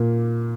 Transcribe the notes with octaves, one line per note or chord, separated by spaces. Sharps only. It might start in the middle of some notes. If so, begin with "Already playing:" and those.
Already playing: A#2 A#3